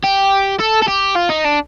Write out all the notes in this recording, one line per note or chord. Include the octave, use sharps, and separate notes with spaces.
G4
A4
A4
G4
F4
D#4
D4